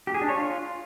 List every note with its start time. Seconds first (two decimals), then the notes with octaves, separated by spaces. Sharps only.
0.07 G4
0.14 G#4
0.22 D4
0.29 C#5
0.36 F4